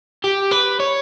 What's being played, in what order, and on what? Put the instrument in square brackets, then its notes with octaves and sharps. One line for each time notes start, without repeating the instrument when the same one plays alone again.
[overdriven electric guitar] G4
B4
C#5